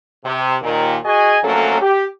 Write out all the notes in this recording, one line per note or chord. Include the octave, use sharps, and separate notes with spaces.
C3
D#2 A#2 D#3
F#4 G#4 D#5 G#5
F2 F#3 A3 A#3 C#4 A4
G4